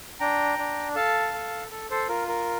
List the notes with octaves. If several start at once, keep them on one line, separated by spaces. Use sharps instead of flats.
D4 G5 A#5
D4
A4 F5 A5
A4
A4
A4 C5
F4 A#4
A#4